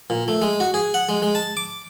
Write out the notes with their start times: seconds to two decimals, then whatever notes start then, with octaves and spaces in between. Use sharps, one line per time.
0.10 A#2
0.28 A3
0.42 G#3
0.60 F#4
0.74 G#4
0.94 F#5
1.09 G#3
1.22 G#3
1.35 A5
1.57 D6